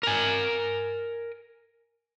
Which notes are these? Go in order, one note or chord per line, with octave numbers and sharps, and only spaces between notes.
A#4 G#5